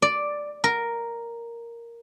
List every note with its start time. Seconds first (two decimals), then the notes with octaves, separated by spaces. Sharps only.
0.02 D5
0.64 A#4